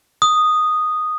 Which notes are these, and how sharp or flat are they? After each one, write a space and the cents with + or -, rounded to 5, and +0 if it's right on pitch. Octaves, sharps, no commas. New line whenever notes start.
D#6 -5